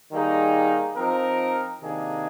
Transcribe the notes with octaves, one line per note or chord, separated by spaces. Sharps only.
D#3 G3 A#3 D#4 G#4
F3 C4 D#4 A#4
C3 D#3 A#3 D4 G#4